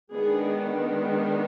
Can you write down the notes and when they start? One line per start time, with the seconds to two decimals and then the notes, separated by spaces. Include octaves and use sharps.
0.14 D#3 G#3 B3 D4 G#4